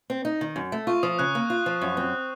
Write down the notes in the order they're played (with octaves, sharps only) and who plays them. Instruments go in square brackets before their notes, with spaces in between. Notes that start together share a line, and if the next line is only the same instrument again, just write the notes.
[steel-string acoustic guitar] C4
D#4
D#3
F#2
A3
[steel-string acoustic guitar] F4 [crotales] C#6
[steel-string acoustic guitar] F3 [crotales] D#6
[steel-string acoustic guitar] C#3 [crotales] F#6
[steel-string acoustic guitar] A#3
F4
F3
F#2
C4